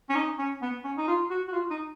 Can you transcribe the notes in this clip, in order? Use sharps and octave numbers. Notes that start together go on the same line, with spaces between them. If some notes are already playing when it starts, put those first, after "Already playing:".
C#4
D#4
C#4
B3
C#4
D#4
F4
F#4
F#4
F4
D#4